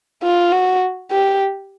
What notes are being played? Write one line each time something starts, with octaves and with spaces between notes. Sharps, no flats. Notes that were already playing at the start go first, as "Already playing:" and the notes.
F4
F#4
G4